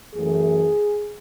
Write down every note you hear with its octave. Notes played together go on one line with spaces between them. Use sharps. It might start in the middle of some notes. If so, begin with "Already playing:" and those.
F#2 E3 A3 G#4